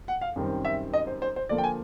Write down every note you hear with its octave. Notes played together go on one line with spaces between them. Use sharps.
F#5
F5
F#2 D#3 G3 C4
E5
D#5
C5
C5
C5
D3 F3 A#3 D5
G5
G#5